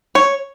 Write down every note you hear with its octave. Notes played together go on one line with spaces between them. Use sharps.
C#5